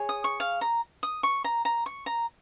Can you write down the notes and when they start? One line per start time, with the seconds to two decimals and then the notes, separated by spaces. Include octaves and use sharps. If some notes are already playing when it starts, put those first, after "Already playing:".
Already playing: G#4 C#5
0.09 D#6
0.24 C#6
0.40 F5
0.61 A#5
1.03 D#6
1.23 C#6
1.44 A#5
1.65 A#5
1.86 C#6
2.06 A#5